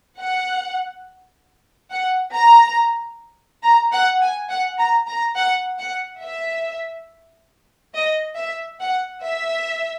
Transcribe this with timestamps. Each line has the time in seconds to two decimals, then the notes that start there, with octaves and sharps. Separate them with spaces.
0.19 F#5
1.91 F#5
2.34 A#5
3.63 A#5
3.92 F#5
4.21 G#5
4.50 F#5
4.78 A#5
5.07 A#5
5.36 F#5
5.79 F#5
6.22 E5
7.94 D#5
8.37 E5
8.81 F#5
9.24 E5